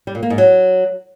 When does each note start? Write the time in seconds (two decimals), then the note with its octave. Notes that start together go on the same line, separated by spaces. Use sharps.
0.07 G3
0.15 A#2
0.23 A#3
0.30 G#2
0.38 F#3